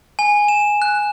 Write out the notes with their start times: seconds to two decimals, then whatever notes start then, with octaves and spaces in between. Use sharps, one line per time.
0.19 G#5
0.48 E7
0.82 F#6